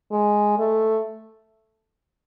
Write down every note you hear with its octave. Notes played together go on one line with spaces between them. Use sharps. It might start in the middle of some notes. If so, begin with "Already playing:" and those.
G#3
A3